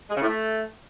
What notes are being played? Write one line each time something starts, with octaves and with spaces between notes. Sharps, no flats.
G#3
C#3
A2
A3